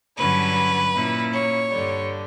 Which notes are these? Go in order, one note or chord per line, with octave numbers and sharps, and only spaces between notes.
G2 D3 F#3 C#4 E4 B4
A#2 A#3 C#4 E4
C#5
G2 D3 G3